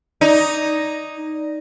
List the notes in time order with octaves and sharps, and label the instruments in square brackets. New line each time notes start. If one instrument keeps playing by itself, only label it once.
[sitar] D#4 [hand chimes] D5